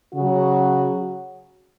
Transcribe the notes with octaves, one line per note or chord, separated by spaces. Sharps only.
C#3 F#3 F#4